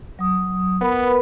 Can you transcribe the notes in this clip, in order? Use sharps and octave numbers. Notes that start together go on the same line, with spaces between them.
F#3 D#6
B3 A#4 B4 B5